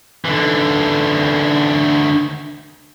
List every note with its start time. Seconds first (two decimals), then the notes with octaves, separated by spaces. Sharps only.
0.25 D3 E3